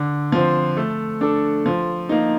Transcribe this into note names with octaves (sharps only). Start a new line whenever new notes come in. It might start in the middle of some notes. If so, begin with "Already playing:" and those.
Already playing: D3
F3 C4
A3
D4 A4
F3
A#3 D#4